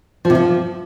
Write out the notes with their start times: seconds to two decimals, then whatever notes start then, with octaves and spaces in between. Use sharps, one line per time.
0.25 F3
0.30 C3
0.35 F3